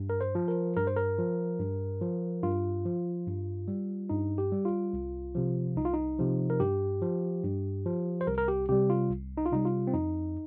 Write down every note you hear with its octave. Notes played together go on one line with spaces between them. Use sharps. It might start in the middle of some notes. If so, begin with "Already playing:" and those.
Already playing: G2
A#4
C5
F3
A#4
G2 A#4
C5
A#4
F3
G2
F3
G2 F4
F3
G2
G3
G2 D#4
G4
G3
F4
C2
C3 F3
C2 D#4
F4
D#4
C3 F3
A#4
G2 G4
F3
G2
F3
C5
C2 A#4
A#4
G4
C3 G3 G4
F4
C2
D#4
F4
C3 G3 D#4
F4
C4
F2 D#4